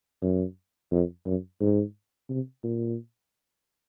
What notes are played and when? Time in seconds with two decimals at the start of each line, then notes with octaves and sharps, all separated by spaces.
0.22 F#2
0.91 F2
1.26 F#2
1.61 G#2
2.30 C3
2.64 A#2